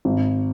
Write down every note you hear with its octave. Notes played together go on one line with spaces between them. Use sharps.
G#1